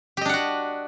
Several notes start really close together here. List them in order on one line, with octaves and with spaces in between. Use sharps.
G4 D#5 D4 F#5 F#4